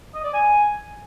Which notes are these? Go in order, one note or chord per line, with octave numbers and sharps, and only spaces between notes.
D#5
D5
G#5